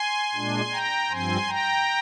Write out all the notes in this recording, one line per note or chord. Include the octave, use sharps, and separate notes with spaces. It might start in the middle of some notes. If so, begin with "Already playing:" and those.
Already playing: G#5 C6
A#2 G#3 D4
G5 A#5
G2 F3 C4 G#5 C6
G5 A#5